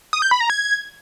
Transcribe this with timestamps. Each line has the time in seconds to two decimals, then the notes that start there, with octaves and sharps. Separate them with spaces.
0.13 D#6
0.22 G6
0.31 B5
0.40 A#5
0.50 G#6